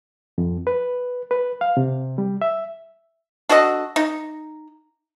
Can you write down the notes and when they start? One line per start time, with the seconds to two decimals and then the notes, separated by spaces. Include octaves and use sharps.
0.38 F2
0.67 B4
1.31 B4
1.61 F5
1.77 C3
2.18 G3
2.41 E5
3.49 D4 F#4 A4 D#5
3.96 D#4